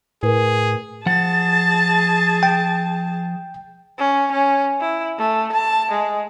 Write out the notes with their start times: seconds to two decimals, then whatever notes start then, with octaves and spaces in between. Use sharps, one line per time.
0.23 A2 G#4 A#4 B4
1.06 F3 G#4 F#5 A5 A6
2.43 G5
3.98 C#4
4.32 C#4
4.80 E4
5.18 A3
5.52 A5
5.91 G#3